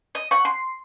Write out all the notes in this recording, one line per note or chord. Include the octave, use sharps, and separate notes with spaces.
D#5
F#5 C#6
C6